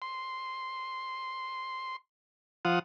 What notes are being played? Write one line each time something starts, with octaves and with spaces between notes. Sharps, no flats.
C6
F3 F4 F#5 D#6